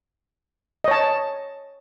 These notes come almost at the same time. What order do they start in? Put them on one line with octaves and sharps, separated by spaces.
D#5 C#5 A5